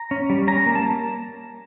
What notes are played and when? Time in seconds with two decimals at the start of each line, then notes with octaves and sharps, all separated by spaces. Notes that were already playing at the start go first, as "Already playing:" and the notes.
Already playing: A#5
0.11 C#4
0.30 G3
0.48 C#4 A#5
0.66 A#3
0.75 A5